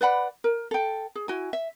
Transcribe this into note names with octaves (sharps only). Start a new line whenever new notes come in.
B4 D5 F#5 B5
A#4
A4 G5
G#4
E4 F#4 G#5
E5